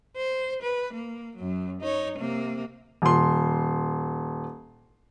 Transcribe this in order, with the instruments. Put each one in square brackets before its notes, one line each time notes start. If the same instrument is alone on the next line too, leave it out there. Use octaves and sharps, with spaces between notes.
[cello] C5
B4
A#3
F#2 F#3
D#4 C#5
C3 A#3
[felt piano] D#1 C6